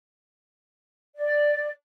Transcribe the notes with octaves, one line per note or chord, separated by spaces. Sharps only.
D5